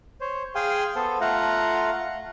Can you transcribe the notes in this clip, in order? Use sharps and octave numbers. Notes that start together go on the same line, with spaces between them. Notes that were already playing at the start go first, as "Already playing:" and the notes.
C5 C#5
G#4 F5 G5 G#5 C6
B3 A4 C5
A3 F4 F5 F#5 A#5